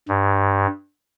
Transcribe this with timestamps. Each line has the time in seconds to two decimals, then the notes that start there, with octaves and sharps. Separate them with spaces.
0.08 G2